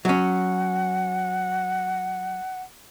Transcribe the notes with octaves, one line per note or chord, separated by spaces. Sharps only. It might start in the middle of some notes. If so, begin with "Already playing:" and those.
F#3 C#4 F#5